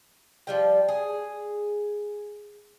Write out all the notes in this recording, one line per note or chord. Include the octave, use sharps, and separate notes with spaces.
F3 G3 G5
G#4